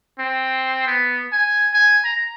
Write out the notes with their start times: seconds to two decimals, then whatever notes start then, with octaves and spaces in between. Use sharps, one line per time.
0.19 C4
0.87 B3
1.32 G#5
1.73 G#5
2.05 A#5